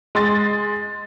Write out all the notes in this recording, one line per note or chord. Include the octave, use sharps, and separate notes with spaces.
G#3 C6 A6